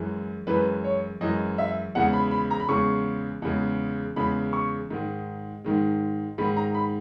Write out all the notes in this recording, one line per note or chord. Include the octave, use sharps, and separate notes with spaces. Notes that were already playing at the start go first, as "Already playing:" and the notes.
Already playing: F#2 E3 G#3
F#2 E3 G#3 B4
C#5
F#2 E3 G#3 D#5
E5
E2 C#3 G#3 F#5
B5
B5
A#5
B5
E2 C#3 G#3 C#6
E2 C#3 G#3
E2 C#3 G#3 B5
C#6
G#2 D#3 G#3
G#2 D#3 G#3
G#2 D#3 G#3 B5
A#5
B5